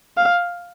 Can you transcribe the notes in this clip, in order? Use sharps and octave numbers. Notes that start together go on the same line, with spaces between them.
F5